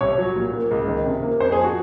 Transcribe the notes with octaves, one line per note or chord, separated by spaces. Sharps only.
C2 C#5
F#3
A#2
A#3
C#2
D#3
C3
A#3
F2 C5
G#4
F3
F#4